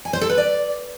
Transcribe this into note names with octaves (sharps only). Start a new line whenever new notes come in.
G#5
C5
A4
B4
D5